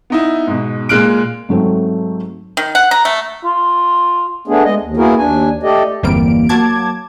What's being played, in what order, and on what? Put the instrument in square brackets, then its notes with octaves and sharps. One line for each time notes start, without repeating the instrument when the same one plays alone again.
[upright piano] B3 D#4 E4
G#2 B2
A#2 G#3 F6 F#6 D7
[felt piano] G#2 F#3 A3 C4
[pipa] D#3
F#5
A#5
A3
[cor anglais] F4
[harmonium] A3 B3 D4 G#4
G#3 D#5
D#2
A#3 B3 E4 F#4 G#4 A#4
D#2 D4 G#5
A3 G4 A4 D5 D#5
[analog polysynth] G1 E2 G3 A#3 C4 D7
F#3 A#3 A5 D6 G#6